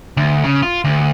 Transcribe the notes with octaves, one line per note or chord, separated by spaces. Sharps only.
D2
C#3
F4
D2